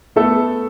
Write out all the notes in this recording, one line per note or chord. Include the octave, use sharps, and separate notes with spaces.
A3 B3 A4